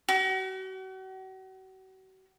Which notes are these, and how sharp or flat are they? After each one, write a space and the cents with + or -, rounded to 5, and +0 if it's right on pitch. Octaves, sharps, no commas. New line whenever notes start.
F#4 +40